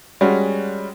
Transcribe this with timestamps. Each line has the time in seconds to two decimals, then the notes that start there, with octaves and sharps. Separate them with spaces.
0.21 G3 G#3 C#4 F#4